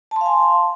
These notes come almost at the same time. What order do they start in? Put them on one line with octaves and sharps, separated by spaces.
A5 C6 F5 G#5